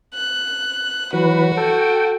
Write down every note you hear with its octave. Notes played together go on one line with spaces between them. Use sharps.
F#6
E3 F#3 F#4 B4
A4 G5